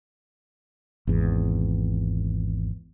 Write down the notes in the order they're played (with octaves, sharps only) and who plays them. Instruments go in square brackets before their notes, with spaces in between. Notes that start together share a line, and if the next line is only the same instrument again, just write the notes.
[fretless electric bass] G#1 E2